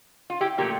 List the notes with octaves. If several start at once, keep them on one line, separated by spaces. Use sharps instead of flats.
F4
E4 G4
A#2 F3 A3 G4 A#4